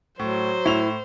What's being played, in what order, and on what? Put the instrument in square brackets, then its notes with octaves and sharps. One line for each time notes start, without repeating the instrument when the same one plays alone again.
[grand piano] A2 [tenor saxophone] F#3 [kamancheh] C5
[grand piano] A2 F7 [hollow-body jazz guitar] E4